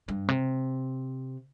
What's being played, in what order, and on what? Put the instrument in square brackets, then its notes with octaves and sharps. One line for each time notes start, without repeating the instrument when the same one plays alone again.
[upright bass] G2
C3